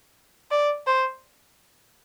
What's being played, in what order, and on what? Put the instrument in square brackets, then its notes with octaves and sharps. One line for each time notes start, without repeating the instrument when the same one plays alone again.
[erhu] D5
C5